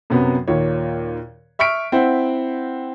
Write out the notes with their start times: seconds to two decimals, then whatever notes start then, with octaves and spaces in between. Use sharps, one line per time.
0.10 F#2 C3 F#3 B3
0.48 D#2 A#2 C#5
1.59 E5 C#6 F6 B6 D7
1.92 C4 E4 C5 F#5